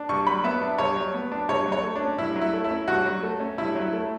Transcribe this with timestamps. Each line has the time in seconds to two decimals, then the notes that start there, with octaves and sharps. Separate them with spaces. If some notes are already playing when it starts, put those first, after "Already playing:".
Already playing: D4
0.09 G2 C#6
0.26 F#3 B5
0.44 B3 E5
0.62 D4
0.78 G2 C#5
0.96 F#3
1.14 B3
1.32 D4
1.49 G2 C#5
1.66 F#3
1.72 C#5
1.83 A3
1.96 D4
2.01 C#4
2.18 G2 E4
2.36 F#3
2.41 E4
2.53 A3
2.64 E4
2.70 C#4
2.88 G2 F#4
3.06 F#3
3.23 A3
3.40 C#4
3.58 G2 E4
3.75 F#3
3.81 E4
3.93 A3